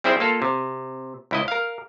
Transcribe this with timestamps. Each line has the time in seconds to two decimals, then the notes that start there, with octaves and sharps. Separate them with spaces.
0.04 G3 C4 E4 G#4 C5 E5
0.20 A#3 F4 A4
0.42 C3
1.31 C#2 E4 D#5
1.48 A#4 F5